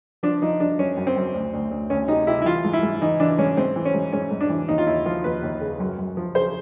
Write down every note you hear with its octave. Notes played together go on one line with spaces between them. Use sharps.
F3 D4
F3 D#4
F3 D4
F#2 C#4
F#2
C4
F#2
D2
D2
D2
D2 C#4
C3 D#4
C3 E4
E4
E3 F4
G#2
E4
G#2
E3 D#4
E3 D4
G#2 C#4
G#2 C4
E3
C#4
G#2
G#2 C#4
G#2
D4
E3
D#2 D#4
F4
D#2 E4
F3 F4
D#2 B4
D#2
C#3
F#2
F#2
F3
C#3 C5